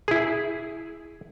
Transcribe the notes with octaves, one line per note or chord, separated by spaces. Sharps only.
E4 G#4